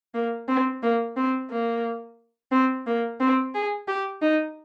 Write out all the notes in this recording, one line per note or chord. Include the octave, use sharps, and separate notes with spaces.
A#3
C4
A#3
C4
A#3
C4
A#3
C4
G#4
G4
D#4